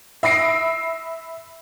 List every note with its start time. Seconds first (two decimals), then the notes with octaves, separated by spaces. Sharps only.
0.23 E5 B5 D#6 A#6 C7 D7